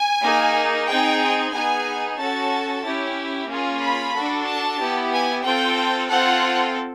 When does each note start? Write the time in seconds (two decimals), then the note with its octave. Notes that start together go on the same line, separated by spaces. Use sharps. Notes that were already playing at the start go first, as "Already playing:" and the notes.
Already playing: G#5
0.22 A#3 D#4 G#4
0.87 C4 D#4 G#4 G5
1.53 B3 D#4 G#4 G#5
2.18 C#4 F#4 A4 A5
2.83 C#4 E4 G4
3.48 A#3 C#4 F4 G#4
3.81 B5
4.14 D4 F#4 A4
4.46 A5
4.79 B3 E4 G4
5.12 G#5
5.44 C4 F4 A4 G5
6.10 C4 F4 A4 F#5